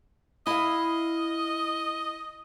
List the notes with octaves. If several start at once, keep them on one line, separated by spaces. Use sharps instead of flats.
E4 D#5 F5